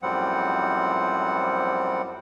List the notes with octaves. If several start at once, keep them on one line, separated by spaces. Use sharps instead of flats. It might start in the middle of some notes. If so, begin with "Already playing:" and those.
F#2 A2 F3 G3 C4 F#5